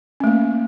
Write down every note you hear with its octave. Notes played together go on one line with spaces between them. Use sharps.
A3 A#3 C#4